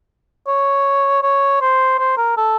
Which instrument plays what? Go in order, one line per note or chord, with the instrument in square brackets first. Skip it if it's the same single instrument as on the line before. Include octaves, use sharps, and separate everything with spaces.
[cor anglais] C#5
C#5
C5
C5
A#4
A4